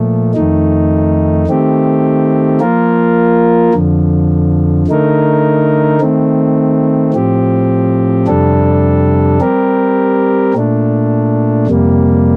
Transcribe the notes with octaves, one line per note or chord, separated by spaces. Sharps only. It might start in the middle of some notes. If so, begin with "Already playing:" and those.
Already playing: A#2 F3 A3
F2 D#3 A3 D#4
D#3 A3 C4 G4
F3 A#3 F4 A#4
F2 D3 F3
D3 A3 D#4 A#4
D#3 A3 C4
A2 F3 C4 G4
F2 C3 G3 D4 A4
G3 C4 G4 A#4
A#2 A3 D4
F2 C3 G3 A#3